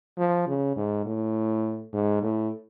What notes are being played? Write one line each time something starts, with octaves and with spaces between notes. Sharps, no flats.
F3
C#3
G#2
A2
G#2
A2